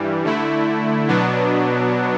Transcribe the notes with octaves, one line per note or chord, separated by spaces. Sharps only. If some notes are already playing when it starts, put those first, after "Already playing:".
Already playing: G2 E3 G3
D3 A3 E4
B2 F#3 B3 D4